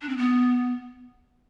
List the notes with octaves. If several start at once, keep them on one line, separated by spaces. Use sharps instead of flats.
D4
C4
B3